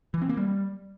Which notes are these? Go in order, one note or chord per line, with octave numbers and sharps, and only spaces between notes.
E3
C4
A#3
G3